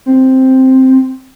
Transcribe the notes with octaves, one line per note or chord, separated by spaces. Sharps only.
C4